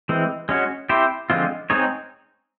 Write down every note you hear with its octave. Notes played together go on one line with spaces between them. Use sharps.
E3 G#3 C4
G#3 C#4 F#4
C4 E4 G4 C5
D3 F3 G#3 C4 F4
G#3 C4 D#4 G#4 C#5